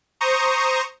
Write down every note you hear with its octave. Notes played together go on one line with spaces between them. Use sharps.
C5 A#5 C#6 D#6